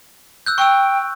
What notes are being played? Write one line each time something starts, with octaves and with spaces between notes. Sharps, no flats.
E6 F#6 G6
G5 C#6 E6